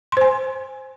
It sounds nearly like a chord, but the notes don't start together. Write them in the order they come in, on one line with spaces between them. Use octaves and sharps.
C6 C5 G#5